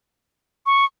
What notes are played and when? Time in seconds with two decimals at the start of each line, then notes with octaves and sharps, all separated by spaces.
0.66 C#6